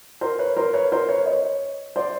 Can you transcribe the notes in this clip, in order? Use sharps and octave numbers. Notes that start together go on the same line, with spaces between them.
A#4 C5
B4 C#5
A#4 C5
B4 C#5
A#4 C5
B4 C#5
C#5 D#5
C5 D5